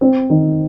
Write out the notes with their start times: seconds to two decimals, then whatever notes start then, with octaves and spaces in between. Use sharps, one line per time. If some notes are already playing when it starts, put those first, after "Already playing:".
0.01 C4
0.30 D#3